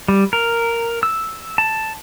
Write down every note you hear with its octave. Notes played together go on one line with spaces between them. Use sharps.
G3
A#4
E6
A5